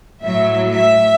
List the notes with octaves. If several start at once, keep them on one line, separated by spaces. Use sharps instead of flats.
A2 F#3 E5
E5